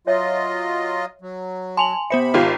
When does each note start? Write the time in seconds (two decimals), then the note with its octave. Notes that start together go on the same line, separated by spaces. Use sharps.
0.07 F#3 F4 C#5 D#5 E5
1.21 F#3
1.77 G#5 A5 C6 F7 F#7
2.10 C3 B3 C5 E5 B5 C#7
2.34 G#1 F4 G4